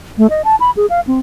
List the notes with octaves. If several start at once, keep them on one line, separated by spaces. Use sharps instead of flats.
A3
D#5
A5
B5
G#4
F5
C4